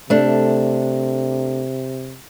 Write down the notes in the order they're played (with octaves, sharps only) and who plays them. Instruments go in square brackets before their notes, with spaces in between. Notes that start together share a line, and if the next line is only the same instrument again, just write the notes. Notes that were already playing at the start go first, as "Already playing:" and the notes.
[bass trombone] C3 [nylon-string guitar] A3 D4